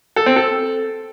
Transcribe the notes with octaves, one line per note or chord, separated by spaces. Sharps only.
A4
C4
A4